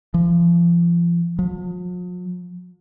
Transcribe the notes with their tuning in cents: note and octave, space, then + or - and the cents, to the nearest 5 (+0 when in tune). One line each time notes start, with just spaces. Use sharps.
F3 -35
F3 +45